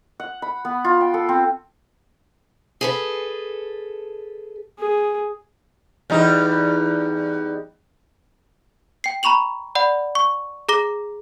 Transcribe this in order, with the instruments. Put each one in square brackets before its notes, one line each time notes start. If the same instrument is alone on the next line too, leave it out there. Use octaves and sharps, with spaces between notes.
[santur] F#5
B5
B3
F4
G5
A4
C4
[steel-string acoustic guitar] G#4 A4 B4
[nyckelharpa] G#4
[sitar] E2 G3 D#4
[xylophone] G5 C7
A#5 B5 C#6 F7 F#7
D5 F#5 B5
C#6
G#4 A#5 D6 A#6 G7